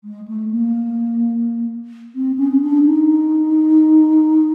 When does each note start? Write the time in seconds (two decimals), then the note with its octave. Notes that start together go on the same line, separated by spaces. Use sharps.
0.04 G#3
0.27 A3
0.51 A#3
2.15 C4
2.38 C#4
2.50 C#4
2.62 D4
2.85 D#4